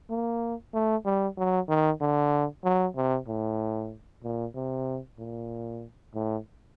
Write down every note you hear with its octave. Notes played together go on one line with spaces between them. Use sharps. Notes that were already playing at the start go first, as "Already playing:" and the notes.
A#3
A3
G3
F#3
D#3
D3
F#3
C3
A2
A#2
C3
A#2
A2